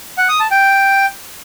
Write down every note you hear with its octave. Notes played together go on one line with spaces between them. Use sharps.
F#5
D#6
A5
G5